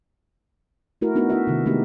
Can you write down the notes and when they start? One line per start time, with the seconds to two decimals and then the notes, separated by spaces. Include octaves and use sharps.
1.01 A3 E4 F#4 A#4
1.15 A3 B3 D4 D#4 F#4 A#4
1.30 E4 F#4 E5
1.47 C3 D#3
1.66 G#3 A3 B3 D#4 G4